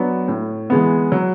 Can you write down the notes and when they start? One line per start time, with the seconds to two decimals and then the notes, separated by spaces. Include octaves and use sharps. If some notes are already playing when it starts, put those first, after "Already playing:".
Already playing: F#3 B3 D4
0.28 A2
0.70 E3 G#3 B3
1.12 F#3